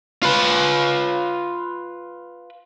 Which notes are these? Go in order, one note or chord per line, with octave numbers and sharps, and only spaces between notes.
F4 B4